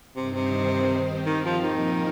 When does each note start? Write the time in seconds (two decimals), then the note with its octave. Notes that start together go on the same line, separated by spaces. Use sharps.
0.16 G2 C3 D#3 C4 D#4 C5
0.34 C3
0.90 D#3 C4 G4
1.26 D#3
1.45 F3
1.63 A#2 D#3 F3 D#4 A#4